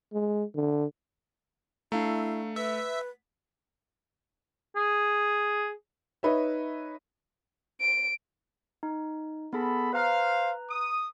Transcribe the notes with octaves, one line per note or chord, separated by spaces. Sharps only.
G#3
D3
A3 D4 E4 F5 A#5
B4 E5 B6
G#4
D#4 B4 C#5 E5
D7
D#4
B3 G#4 A4 B5
B4 C5 F5 A#5
D#6